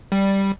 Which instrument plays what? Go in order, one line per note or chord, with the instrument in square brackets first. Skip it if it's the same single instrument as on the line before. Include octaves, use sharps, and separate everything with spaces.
[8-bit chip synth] G3